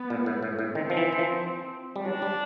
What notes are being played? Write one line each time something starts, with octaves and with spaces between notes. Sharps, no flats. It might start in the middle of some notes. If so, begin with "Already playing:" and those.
Already playing: B3
A#2
A2
A2
A2
D#3 C4
F3
E3
E3
F3
G3
F#3 D4
G3